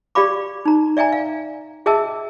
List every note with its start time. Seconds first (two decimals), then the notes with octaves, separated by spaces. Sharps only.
0.15 G4 D5 F5 B5 D6
0.65 D#4 A#5
0.97 D5 E5 G5 G#5 A#5
1.12 F5
1.86 G#4 D#5 E5 G5 A5 E6